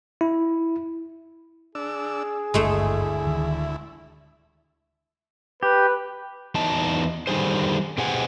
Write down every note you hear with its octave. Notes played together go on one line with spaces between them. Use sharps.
E4
D4 G#4 E6
G#1 D2 G2 G#3 A3 D4 E4
D1 D#3
G4 B4
E2 D#4 A5
D3 D#3 G3 G#4 C5
B2 G4 G#4 C5 F#5 G#5